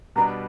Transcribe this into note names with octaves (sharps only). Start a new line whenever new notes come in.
B2 G3 B3 D4 A#5